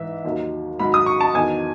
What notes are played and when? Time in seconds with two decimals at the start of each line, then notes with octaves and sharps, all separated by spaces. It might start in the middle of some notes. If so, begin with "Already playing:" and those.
Already playing: G#2 E3 E5
0.24 D#2 D#3 F#3
0.79 G#2 D#3 F#3 B5
0.94 D#6
1.06 C#6
1.21 A5
1.34 E2 D#3 F#3 G#5